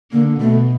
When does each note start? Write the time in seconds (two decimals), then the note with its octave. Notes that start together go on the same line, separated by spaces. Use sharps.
0.12 D3 A#3
0.40 B2 A3